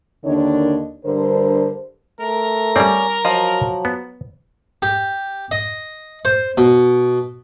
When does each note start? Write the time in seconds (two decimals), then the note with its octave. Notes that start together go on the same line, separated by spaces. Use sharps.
0.25 D#2 D3 D#3 D4 C#5 D#5
1.06 G2 D3 A#4 C5
2.20 A3 A#4
2.76 G3 C4 C#4 D5
3.25 F3 F#3 D#5 F5
3.85 B3
4.82 G4
5.51 D#5
6.25 C5
6.58 B2